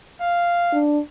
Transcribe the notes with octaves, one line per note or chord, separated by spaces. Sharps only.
F5
D4